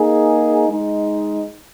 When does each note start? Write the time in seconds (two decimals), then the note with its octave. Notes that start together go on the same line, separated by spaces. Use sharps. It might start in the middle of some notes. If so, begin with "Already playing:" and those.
Already playing: A#3 D#4 G#4
0.68 G#3 D#4